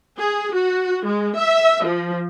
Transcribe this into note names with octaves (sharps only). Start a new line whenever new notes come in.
G#4
F#4
G#3
E5
F3